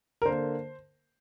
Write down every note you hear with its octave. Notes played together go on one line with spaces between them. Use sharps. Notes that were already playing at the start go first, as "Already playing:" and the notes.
A#4
D3 A#3 C5